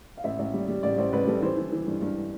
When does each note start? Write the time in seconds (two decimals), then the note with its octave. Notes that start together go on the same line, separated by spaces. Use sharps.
0.17 F5
0.24 A1 E5
0.39 A1
0.54 G3
0.68 G3
0.83 A1 D5
0.98 A1 C5
1.13 A1 B4
1.27 G3 A4
1.42 E3 C5
1.57 E3
1.72 E3
1.87 G2
2.02 G2